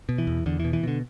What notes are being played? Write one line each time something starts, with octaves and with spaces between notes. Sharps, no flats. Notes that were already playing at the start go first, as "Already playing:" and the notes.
B2
E3
E2
E2 D3
B2 E3
E3
B2 D3